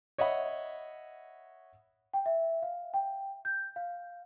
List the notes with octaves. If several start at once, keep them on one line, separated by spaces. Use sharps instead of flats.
C#5 D#5 E5 F#5 B5
G5
E5
F5
G5
G6
F5